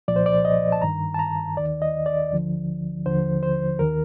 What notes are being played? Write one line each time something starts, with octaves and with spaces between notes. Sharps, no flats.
C2 A#2 F3 D5
C5
D5
D#5
A5
G2 D#3 A#5
A5
A#5
D#2 D#3 D5
D#5
D5
D2 D3 F3
D#2 D3 F3 C5
C5
D#2 D#3 A#4